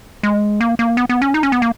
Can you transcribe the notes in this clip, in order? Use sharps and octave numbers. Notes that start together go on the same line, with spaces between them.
G#3
A#3
A#3
B3
B3
C#4
D#4
C#4
B3
A#3